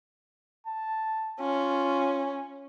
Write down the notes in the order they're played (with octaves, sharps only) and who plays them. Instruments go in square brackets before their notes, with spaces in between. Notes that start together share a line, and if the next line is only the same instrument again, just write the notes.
[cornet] A5
[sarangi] C#4 [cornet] F4